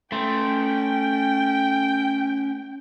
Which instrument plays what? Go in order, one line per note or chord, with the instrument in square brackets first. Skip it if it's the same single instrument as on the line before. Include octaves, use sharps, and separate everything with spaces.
[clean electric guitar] A3 [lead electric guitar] C#4 C6 [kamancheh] G5